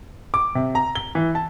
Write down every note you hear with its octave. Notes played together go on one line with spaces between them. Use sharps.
D6
C3
A#5
G7
E3
A5